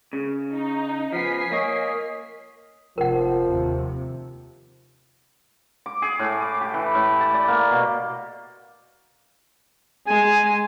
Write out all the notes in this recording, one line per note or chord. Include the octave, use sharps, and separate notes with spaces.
C#3
D#4
F3 B3 G#5 B6 C7
A#3 C#5 D#5
F1 F3 A#4 F#5
D#2 C3
D6
G#4
A2
D6
G4
E3
A2
A5
D5
A#3
B2
G#3 G#5